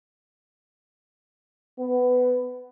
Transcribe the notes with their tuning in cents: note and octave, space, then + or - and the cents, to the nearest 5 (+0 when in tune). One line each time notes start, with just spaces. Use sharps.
B3 +15